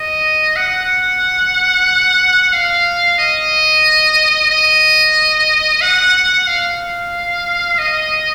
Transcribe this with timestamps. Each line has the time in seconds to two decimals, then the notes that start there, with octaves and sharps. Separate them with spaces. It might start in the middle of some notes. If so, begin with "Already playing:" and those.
Already playing: D#5
0.56 F#5
2.53 F5
3.18 D#5
4.50 D#5
5.81 F#5
6.47 F5
7.78 D#5